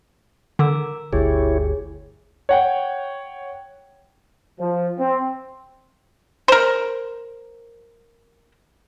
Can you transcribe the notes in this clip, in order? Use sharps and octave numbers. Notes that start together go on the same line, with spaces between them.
D3 A#4 D6 E6
G1 D2 E4 G4 G#4 C#5
C#5 F#5 G5
F3
C4
A#4 C5